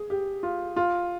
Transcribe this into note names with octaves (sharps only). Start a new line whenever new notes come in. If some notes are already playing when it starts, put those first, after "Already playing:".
Already playing: G#4
G4
F4
F4